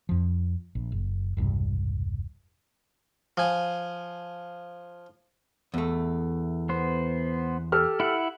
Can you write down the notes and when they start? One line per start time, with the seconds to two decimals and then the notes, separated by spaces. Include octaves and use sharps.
0.09 F2 F3
0.75 A#1
0.92 F#1
1.37 E1 C2 G2
3.37 F3 G#5
5.74 E2 A3
6.69 B3 C5
7.72 G4 A4 F6
8.00 E4 F#5